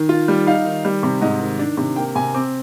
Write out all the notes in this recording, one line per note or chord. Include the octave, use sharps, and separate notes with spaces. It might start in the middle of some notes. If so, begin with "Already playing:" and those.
Already playing: D#3
F4
G3
D#4 F5
D#3
G3
C3
G#2 D#5
D#3
D4
C3
A#3 G5
C3 G#5
C4 D6